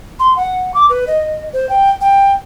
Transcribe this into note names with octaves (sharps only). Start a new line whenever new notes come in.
C6
F#5
D6
B4
D#5
C5
G5
G5